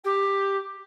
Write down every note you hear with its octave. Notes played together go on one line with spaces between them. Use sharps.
G4